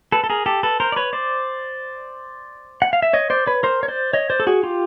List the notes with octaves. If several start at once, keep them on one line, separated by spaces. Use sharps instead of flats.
A4 B4
A4
G#4 A#4
G4 A4
A4 B4
A#4 C5
D5
B4 C#5
C5 D5
F#5
F5
E5
C#5 D#5
C5 D5
B4 C#5
A#4 C5
C#5
C5 D5
C#5 D#5
C5 D5
A4
F#4 G#4
F4 G4